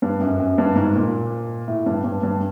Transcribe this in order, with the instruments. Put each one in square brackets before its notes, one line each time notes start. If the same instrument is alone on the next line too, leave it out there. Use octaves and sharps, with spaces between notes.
[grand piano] G2
F#2
F#2
G2
G#2
A#2
A2
G2
G2
G2